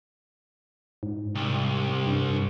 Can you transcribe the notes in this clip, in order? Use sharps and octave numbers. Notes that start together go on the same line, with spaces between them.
G#2
C2
G2